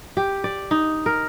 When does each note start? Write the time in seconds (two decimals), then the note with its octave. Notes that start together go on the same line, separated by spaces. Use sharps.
0.17 G4
0.44 D5
0.71 D#4
1.06 A#4